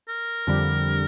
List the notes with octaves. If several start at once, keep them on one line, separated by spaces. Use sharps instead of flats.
A#4
F2 D3 G3